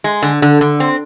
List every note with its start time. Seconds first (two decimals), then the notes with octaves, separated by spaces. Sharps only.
0.04 G#3
0.23 D3
0.42 D3
0.61 D3
0.80 C4